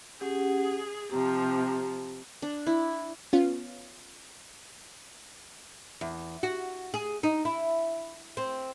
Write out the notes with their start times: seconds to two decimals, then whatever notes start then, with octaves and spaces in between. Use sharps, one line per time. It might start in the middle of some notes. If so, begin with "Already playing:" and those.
0.21 C#4 G4 G#4 F#5
1.11 C3 F3 G4 A#5
2.42 D4
2.67 E4
3.33 B3 C#4 F4
6.01 E2
6.43 F#4
6.94 G#4
7.23 D#4
7.45 E4
8.37 C4